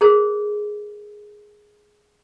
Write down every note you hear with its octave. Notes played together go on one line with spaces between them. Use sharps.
G#4 A#4 C5